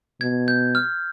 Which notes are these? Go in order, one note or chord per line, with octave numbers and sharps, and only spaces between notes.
B2 G#6
G6
F6